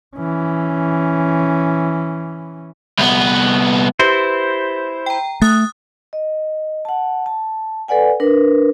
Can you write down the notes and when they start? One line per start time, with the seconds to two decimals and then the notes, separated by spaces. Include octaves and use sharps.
0.17 E3 C#4
2.98 C2 B3
3.99 E4 G4 B4 C5
5.06 G5 A#5
5.42 A3 D#6 F#6 A6
6.13 D#5
6.85 F#5 A5
7.26 A5
7.88 A4 B4 D5 F#5 G#5
8.20 D4 A#4 B4